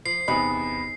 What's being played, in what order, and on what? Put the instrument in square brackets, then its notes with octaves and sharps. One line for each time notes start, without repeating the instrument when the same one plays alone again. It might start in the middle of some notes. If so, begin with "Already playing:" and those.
[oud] F3 [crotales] C7
[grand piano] E2 C3 B3 [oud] D#4 [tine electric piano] B5